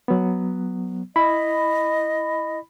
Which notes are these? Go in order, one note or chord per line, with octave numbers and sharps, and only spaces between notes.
F#3 B3
E4 D#5 B5